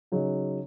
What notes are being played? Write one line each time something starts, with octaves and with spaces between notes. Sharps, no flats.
C#3 F#3 D#4